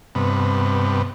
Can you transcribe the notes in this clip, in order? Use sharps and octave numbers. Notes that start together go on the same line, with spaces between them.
G2 C3 B3